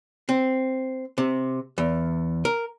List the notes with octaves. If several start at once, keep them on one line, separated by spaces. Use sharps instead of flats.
C4
C3
E2
A#4